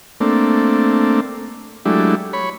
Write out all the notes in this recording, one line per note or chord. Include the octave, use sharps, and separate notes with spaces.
A3 A#3 C4 D4
F#3 G#3 A3 D4 E4 G4
C#5 B5